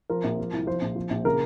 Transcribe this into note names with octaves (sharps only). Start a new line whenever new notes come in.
F3 A#4
A#1
F3
C2
F3 C5
A#1
F3
A#1
C#3 A#4